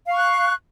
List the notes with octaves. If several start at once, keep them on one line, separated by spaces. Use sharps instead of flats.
F5 C#6 F#6